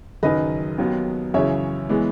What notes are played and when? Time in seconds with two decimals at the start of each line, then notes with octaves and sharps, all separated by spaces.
0.23 F#1 F#2 D#3 B4 D#5
0.78 D#2 D#3 F#3 B3
1.34 F#2 C#3 E3 C#5 E5
1.89 E3 G#3 B3